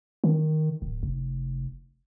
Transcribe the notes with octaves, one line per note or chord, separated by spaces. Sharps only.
D#3
D1
F1